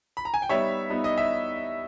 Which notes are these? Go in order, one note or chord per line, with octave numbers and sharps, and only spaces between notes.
B5
A#5
G#5
G5
G3 B3 D#4 C#5 E5
G3 B3 D#4
D#5
E5